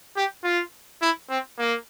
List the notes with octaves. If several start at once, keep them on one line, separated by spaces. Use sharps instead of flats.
G4
F4
E4
C4
A#3